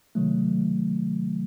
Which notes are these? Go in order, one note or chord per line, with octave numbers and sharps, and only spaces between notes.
C3 D#3 F#3 A3